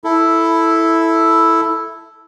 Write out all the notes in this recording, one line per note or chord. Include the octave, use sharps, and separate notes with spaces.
E4 A4